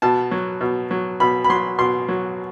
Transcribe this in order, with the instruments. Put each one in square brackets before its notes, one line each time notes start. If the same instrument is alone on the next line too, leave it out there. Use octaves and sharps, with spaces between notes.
[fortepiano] B2 A5
F#3
B2
F#3
B2 B5
B5
F#3 C6
B2 C6
F#3